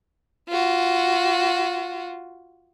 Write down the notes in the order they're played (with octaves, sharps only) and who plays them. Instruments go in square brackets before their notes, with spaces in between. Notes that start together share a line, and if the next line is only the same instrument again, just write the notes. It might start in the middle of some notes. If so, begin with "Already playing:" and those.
[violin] F4 F#4